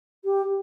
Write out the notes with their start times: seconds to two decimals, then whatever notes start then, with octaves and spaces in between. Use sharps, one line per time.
0.24 G4